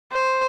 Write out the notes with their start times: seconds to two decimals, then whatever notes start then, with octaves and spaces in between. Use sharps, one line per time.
0.12 C5